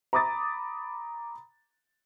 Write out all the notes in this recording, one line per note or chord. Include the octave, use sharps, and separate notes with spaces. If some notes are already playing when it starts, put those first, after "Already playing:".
A#5 B5 D6 D#6 A6